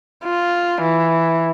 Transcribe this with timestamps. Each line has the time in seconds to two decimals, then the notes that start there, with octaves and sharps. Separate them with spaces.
0.24 F4
0.82 E3